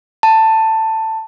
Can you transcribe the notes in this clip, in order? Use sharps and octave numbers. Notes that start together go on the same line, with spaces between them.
A5